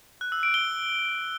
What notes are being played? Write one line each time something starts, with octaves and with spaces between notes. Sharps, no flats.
F#6
E6
D7
G7